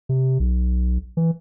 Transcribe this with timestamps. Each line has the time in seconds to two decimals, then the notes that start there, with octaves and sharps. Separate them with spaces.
0.09 C3
0.40 B1
1.17 E3